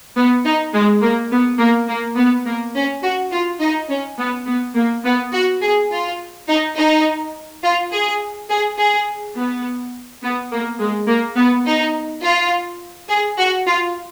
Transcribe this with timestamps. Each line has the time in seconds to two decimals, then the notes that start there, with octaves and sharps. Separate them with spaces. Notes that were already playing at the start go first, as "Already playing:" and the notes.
0.16 B3
0.45 D#4
0.74 G#3
1.02 A#3
1.31 B3
1.59 A#3
1.88 A#3
2.16 B3
2.45 A#3
2.75 C#4
3.03 F#4
3.32 F4
3.60 D#4
3.89 C#4
4.18 B3
4.46 B3
4.75 A#3
5.05 B3
5.33 F#4
5.62 G#4
5.91 F4
6.48 D#4
6.76 D#4
7.64 F4
7.92 G#4
8.50 G#4
8.78 G#4
9.36 B3
10.22 B3
10.51 A#3
10.80 G#3
11.07 A#3
11.36 B3
11.66 D#4
12.23 F4
13.09 G#4
13.38 F#4
13.67 F4